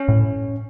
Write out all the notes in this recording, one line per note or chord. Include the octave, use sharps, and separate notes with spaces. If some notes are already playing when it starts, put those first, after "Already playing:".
Already playing: C#4
A2